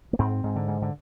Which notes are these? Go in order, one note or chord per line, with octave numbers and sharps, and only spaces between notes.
A#3
G#2 C4
G#2
D3
G#2
D3